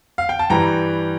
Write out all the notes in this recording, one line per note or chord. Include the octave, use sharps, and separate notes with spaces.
F5
G5
A5
G2 E3 G3 G5 A#5